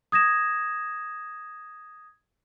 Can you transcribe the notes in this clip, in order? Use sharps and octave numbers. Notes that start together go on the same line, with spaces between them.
D#6 G#6 A#6 E7